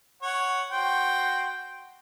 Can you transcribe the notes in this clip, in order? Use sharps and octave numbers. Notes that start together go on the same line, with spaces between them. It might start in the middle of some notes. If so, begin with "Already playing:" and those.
C#5 F#5
F#4 C5 G5